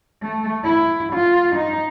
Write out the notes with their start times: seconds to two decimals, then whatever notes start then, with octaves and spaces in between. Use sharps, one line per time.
0.22 A3
0.64 E4
1.13 F4
1.56 D#4